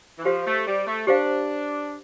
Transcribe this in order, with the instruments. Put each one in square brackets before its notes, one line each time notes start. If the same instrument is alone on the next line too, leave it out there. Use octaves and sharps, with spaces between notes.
[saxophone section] E3
[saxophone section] F3 [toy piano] G4 C5 F5
[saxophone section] A3
G3
A3
[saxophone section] D4 [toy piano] G4 C5 F5